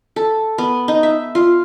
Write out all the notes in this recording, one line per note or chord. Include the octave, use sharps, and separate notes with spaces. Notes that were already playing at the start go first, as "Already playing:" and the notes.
A4
B3
D#4
E5
F4